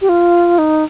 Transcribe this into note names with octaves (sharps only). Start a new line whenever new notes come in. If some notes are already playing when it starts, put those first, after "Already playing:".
G4
F4
D#4